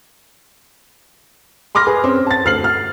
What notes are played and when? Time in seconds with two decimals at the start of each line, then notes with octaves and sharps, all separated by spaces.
1.75 B5 C6 D6 F6 A#6
1.87 G#4 B4
2.04 C4 C#4
2.27 A5 A6
2.45 D2 F6 C7 F#7
2.64 F6